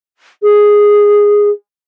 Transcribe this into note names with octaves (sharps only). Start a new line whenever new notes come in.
G#4